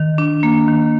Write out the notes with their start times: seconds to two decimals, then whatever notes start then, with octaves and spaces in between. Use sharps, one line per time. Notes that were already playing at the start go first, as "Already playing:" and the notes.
Already playing: D#3
0.18 D4
0.43 A#3
0.68 D#3